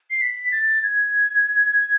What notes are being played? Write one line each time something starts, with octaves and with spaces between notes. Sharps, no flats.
C7
B6
A6
G#6